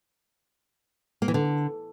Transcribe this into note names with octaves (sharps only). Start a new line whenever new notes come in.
A#3
E3
D3